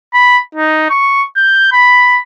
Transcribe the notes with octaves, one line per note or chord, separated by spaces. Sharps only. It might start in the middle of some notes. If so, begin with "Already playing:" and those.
B5
D#4
C#6
G6
B5